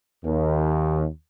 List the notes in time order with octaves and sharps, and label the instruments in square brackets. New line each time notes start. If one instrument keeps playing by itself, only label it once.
[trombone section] D#2